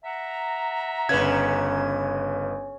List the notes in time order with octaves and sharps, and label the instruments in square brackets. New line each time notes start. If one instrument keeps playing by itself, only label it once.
[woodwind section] E5 F#5 A#5
[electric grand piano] G1 B4 G#6 [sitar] C#3